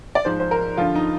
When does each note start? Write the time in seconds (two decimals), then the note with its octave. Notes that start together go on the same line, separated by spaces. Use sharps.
0.15 D5
0.25 G#2 F3 C5
0.40 C5
0.51 A#4
0.77 G2 D3 F3 F4
0.95 D#4